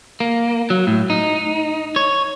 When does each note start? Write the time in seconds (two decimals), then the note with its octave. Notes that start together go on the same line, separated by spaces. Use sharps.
0.20 A#3
0.70 F#3
0.87 A2
1.10 D#4
1.96 C#5